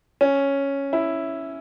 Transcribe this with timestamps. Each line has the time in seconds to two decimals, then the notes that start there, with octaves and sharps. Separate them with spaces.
0.21 C#4
0.93 E4